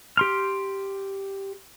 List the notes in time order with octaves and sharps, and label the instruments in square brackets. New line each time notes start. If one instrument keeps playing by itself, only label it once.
[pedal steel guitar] G4 C6 F6